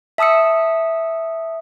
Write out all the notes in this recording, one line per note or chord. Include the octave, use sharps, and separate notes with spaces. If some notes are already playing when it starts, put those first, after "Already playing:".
E5 A5 D#6 E6 C#7